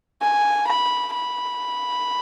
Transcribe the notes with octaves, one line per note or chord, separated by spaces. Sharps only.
G#5
B5
B5